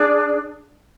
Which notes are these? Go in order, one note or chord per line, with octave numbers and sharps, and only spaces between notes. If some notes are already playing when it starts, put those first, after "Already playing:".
Already playing: D4 G#4 D5